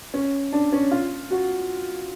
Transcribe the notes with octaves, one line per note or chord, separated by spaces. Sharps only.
C#4
D4
C#4
F4
F#4